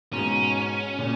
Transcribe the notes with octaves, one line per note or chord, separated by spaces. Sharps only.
G#2 B2 C#4
A#2 C#3